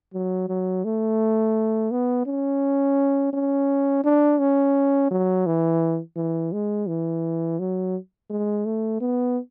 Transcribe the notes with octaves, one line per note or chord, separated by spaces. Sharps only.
F#3
F#3
A3
B3
C#4
C#4
D4
C#4
F#3
E3
E3
G#3
E3
F#3
G#3
A3
B3